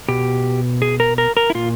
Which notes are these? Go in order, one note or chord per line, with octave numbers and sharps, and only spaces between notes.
B2 G4
G#4
A#4
A#4
A#4
E4
A#2 F4